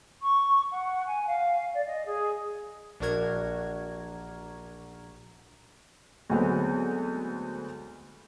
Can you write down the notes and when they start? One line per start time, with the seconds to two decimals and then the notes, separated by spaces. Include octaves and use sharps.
0.22 C#6
0.71 F#5
1.06 G#5
1.27 F5
1.74 D5
1.86 D#5
2.05 G#4
3.00 A#1 D4 F#4 A#4 G#6
6.30 D2 F#3 G#3 B3 C4